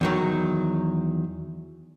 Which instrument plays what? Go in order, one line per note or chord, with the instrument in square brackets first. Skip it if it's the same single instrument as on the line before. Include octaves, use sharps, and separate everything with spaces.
[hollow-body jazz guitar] E2 D#3 F#3